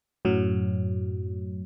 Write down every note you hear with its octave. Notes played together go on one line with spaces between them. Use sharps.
F#2 A2 F#3